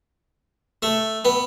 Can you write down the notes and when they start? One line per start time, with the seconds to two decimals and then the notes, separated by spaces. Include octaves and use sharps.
0.82 A3
1.25 B3